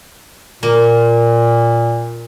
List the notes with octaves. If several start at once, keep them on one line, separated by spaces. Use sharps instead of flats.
A#2 A#3